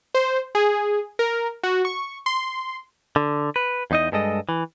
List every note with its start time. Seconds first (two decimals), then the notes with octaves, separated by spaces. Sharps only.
0.15 C5
0.55 G#4
1.19 A#4
1.63 F#4
1.85 C#6
2.26 C6
3.16 D3
3.56 B4
3.91 E2 D#4 D#5
4.12 G2 G#3 A4 D#5
4.49 E3